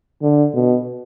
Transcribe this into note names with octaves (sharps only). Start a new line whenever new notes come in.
D3
B2